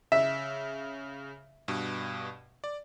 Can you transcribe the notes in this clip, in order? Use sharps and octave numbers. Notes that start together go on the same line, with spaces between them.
C#3 E5
G2 B2
D5